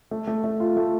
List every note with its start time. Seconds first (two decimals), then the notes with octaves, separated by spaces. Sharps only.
0.11 A3
0.27 A3
0.44 A3
0.60 F4
0.77 A3